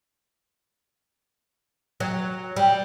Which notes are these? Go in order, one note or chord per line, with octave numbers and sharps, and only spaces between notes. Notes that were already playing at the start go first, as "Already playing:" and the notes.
F#3
G3